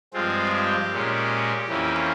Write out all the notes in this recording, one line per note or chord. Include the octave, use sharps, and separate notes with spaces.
G2 F3 G#3 C4 F4
G4
A#2 G#3 C#4
F2 E3 A#3 C#4